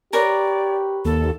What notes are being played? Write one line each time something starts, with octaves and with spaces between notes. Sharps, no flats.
G4 A#4 B4 C#5 D5
D#2 A4